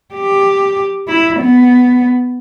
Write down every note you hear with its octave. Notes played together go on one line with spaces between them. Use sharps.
G4
E4
B3